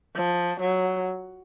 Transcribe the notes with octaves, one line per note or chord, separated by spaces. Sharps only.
F3
F#3